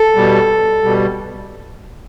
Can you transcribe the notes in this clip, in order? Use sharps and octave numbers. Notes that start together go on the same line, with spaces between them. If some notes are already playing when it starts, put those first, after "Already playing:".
Already playing: A4
B2 G3
B2 G3